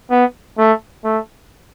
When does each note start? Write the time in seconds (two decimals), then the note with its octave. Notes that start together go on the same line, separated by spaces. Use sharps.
0.11 B3
0.58 A3
1.05 A3